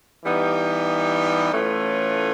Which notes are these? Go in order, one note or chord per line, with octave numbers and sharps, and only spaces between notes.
E3 G3 B3 D#4 G4
A2 E3 A3 C#4 F4